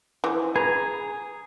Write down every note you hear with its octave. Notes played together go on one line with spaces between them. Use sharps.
E3 F3
G#4 B4 A#5